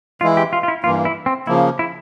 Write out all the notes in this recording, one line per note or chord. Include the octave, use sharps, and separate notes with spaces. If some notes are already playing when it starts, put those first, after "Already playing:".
E3 G#3 E4 F4
G4
F4
F4
E4
G2 E3 A#3 F4
E4
C4
C#3 F3 A#3 E4
E4